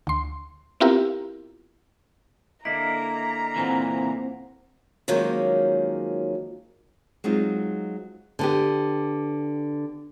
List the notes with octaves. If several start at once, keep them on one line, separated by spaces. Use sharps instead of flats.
D2 C6
B3 C4 E4 F4 G4 A#4
D3 A#3 E4 D#5 A#5
A#2 E3 C4 C5 F#5
D#3 F3 F#3 G#3 A#3 C#4
F#3 G#3 C4 D#4 F4
D3 B3 G4